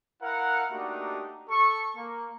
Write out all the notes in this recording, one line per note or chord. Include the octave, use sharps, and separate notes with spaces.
E4 A#4 F5 F#5
A3 A#3 D4 D#4 F#4 G4
A4 C#6
A#3